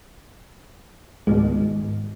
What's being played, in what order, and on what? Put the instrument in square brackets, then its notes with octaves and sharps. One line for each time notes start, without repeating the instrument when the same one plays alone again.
[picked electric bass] G#1 G#2 G#3 [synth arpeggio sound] C#2 B2